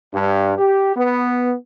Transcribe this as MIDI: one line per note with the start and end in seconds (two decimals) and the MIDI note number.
0.13 0.53 43
0.58 0.93 67
0.95 1.53 59